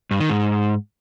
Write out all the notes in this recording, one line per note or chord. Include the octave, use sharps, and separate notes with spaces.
G2
D#3
G#2